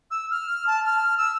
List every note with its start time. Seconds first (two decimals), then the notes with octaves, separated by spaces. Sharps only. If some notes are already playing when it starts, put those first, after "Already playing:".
0.11 E6
0.31 F6
0.67 A5
0.85 F6
1.18 E6